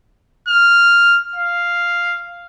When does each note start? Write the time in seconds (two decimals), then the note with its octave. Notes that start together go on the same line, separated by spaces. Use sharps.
0.49 F6
1.36 F5